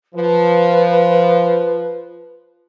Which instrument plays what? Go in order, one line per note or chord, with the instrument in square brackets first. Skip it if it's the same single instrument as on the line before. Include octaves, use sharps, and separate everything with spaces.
[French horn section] F3 [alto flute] B4